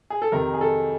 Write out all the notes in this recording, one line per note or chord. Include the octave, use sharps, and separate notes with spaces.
G#4
A4
F2 C3 D#3 A#4
G#4
A4